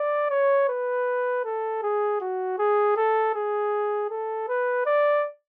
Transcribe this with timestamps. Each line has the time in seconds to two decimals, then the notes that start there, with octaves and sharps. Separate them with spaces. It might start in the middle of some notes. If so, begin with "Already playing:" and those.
Already playing: D5
0.30 C#5
0.69 B4
1.45 A4
1.83 G#4
2.21 F#4
2.59 G#4
2.97 A4
3.35 G#4
4.11 A4
4.49 B4
4.86 D5